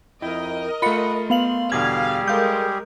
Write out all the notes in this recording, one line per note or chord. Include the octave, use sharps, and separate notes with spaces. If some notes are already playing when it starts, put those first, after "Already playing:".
F2 E4 A#4 D#5 G5
A3 F4 F#5 B5 C#7
B3 F5 C6 F#7
E2 B2 D3 G3 G4 G#4 F5 G#6
G#3 A4 A#4 F5 D6 G6